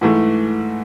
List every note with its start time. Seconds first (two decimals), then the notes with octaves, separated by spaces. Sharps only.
0.01 G#2 E3 A3